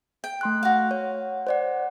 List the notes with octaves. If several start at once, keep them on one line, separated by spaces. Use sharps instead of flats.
G5
A3 C6 F#6
F#4 F5
C#5
C5 D5 F#5